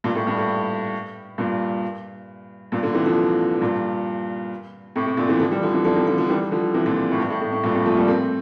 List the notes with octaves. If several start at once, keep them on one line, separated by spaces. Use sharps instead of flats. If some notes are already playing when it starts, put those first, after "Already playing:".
G2 A#2
A2
G2
A2
G2 A#2
G2 A#2
A#2 D3
C3 E3
D3 F3
G2 A#2
A2 C3
A2 C3
A#2 D3
C3 E3
D3 F3
E3 G3
D3 F3
C3 E3
D3 F3
C3 E3
D3 F3
D3 F3
E3 G3
D3 F3
C3 E3
A#2 D3
A2
G2
A2
A2
A2
G2 A#2
A2 C3
F3 A3
G3 A#3
A3 C4